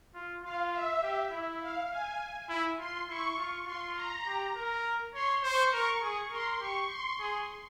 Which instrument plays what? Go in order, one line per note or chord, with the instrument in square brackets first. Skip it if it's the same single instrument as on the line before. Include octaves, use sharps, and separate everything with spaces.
[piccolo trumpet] F4
[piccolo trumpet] F4 [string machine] F5
[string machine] E5
[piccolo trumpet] G4
E4
[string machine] F5
G#5
[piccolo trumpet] E4
[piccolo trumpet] F4 [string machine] C6
[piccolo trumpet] E4 [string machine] C#6
[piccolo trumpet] F4
[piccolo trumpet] F4 [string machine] C6
[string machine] A#5
[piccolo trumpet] G4
A#4
[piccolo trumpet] C#5 [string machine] C6
[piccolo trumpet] C5 [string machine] C#6
[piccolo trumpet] A#4 [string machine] C#6
[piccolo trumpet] G#4
[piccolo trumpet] A#4 [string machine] C6
[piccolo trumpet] G4 [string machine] C#6
[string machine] C6
[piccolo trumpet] G#4